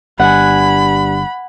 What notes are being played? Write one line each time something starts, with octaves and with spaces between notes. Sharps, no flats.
G1 G2 F#5 G#5 B5